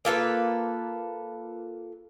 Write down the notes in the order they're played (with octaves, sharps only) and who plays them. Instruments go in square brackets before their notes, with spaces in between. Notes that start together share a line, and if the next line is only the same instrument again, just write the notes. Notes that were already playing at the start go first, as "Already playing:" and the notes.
[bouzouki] A#3 F4 A4 B4